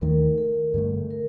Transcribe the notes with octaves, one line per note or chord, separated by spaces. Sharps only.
D#2 D#3 A3 A#4
A4
G2 D3 A3
A#4